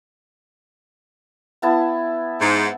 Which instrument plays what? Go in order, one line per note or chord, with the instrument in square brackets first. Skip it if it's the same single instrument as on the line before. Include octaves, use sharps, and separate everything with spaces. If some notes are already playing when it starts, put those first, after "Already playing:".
[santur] B3 E4 A5
[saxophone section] G#2